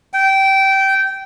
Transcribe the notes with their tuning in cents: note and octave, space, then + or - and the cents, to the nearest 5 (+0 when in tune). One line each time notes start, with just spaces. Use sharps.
G5 -20